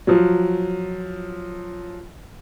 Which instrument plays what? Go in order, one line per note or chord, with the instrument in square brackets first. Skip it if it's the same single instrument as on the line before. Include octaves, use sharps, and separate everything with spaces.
[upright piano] F3 F#3